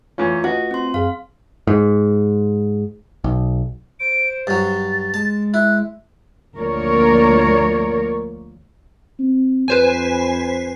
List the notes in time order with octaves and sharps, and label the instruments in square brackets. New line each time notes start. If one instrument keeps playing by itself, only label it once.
[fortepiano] E2 C#4 [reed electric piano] A3 F4
[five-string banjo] F#4 [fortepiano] B4 D#5
[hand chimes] C4 C6
[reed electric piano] F#2 G#4 [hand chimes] F5
[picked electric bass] G#2
B1
[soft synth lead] C5 [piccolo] D7
[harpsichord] G2 F#3 [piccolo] A6
[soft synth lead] G#3 [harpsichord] A5
[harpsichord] E4 [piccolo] F#6
[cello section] D2 F3 A#3 A#4 C#5 D5
[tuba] C4
[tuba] F2 [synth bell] B4 C5 G#5